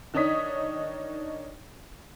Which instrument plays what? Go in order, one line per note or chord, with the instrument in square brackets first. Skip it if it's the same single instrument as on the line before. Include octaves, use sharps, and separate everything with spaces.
[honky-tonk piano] D#3 D4 D#4 C#5 D#6 B6